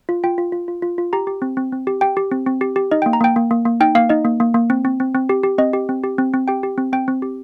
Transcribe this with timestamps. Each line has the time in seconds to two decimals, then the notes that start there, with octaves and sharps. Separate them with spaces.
0.09 F4
0.24 F4 G5
0.38 F4
0.52 F4
0.68 F4
0.82 F4
0.98 F4
1.13 G4 A#5
1.27 G4
1.42 C4
1.57 C4
1.72 C4
1.87 G4
2.01 G4 G5
2.17 G4
2.31 C4
2.47 C4
2.61 G4
2.76 G4
2.91 D#4 D#5
3.02 G5
3.06 A#3
3.13 A#5
3.21 A#3 G5
3.36 A#3
3.51 A#3
3.65 A#3
3.81 D#4 G5
3.95 A#3 F5
4.09 D#4 D#5
4.25 A#3
4.40 A#3
4.54 A#3
4.70 C4
4.85 C4
5.00 C4
5.15 C4
5.29 G4
5.43 G4
5.58 C4 D#5
5.73 G4
5.89 C4
6.04 G4
6.18 C4
6.34 C4
6.48 G4 G5
6.63 G4
6.78 C4
6.93 C4 G5
7.08 C4
7.22 G4